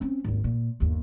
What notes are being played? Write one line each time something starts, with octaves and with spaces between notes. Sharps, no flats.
C4 C#4
G#1 D#2
A#2
G1 D#2